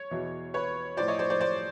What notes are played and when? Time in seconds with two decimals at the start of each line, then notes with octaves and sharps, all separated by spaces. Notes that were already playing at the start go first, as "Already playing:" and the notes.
Already playing: C#5
0.11 E2 B2
0.54 B4 C#5
0.97 A2 F3 C5 D5
1.08 C#5 D#5
1.19 C5 D5
1.30 C5 D5
1.40 C5 D5